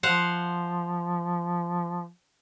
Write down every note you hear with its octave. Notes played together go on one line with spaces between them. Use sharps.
F3 C5 F5 F#5